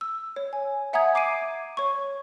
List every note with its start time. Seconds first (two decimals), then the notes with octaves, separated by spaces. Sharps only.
0.01 E6
0.36 C#5
0.53 G#5
0.93 E5 F#5 G#5 A#5 D#6 G#6
1.15 D6 C7 D7 D#7
1.77 C#5 C#6